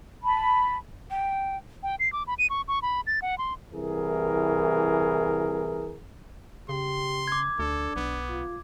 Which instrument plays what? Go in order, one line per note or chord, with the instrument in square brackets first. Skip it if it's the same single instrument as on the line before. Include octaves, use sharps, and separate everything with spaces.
[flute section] A5 B5
[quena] G5
[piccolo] G5
C7
D6
B5
D#7
C#6
C#6
B5
A6
F#5
C6
[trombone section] C2 E3 G#4 A#4
[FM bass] C#3 [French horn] G4 [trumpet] C6
[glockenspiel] D6 G#6
[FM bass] D2 [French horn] D4 [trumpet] A4
[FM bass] B1 [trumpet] B3
[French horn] F4